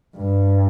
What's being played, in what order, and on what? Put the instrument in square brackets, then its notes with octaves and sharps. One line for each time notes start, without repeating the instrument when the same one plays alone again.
[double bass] G2